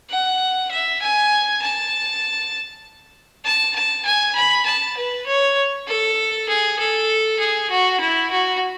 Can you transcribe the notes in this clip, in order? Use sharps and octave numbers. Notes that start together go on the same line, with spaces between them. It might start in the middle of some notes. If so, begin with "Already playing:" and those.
F#5
E5
G#5
A5
A5
A5
G#5
B5
A5
B4
C#5
A4
G#4
A4
G#4
F#4
E4
F#4